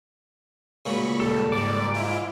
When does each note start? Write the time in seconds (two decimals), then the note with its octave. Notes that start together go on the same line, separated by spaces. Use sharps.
0.86 C#2 A#2 F#3 B5 C#6
1.20 D#1 G3 A4
1.52 G#2 G3 D5 D6
1.94 E4 F4